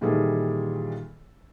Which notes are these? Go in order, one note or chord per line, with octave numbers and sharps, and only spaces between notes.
A#2 D#3 E3 G3 G#4 A4